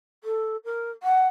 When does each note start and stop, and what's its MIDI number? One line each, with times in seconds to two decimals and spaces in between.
0.23 0.56 69
0.64 0.90 70
1.02 1.27 78